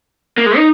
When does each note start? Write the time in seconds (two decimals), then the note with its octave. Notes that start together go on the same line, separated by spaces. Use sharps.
0.38 A#3
0.46 G#3
0.57 D#4